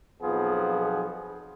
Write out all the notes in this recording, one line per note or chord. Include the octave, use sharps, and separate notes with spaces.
B1 F2 F3 B3 G#4